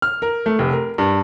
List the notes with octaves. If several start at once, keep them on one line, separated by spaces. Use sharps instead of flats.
F6
A#4
A3
F1
A#4
G2